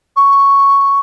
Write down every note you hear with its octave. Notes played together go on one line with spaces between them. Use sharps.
C#6